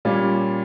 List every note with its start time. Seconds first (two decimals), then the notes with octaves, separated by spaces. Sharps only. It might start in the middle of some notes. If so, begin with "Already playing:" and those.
0.05 A#2 G3 C#4 F4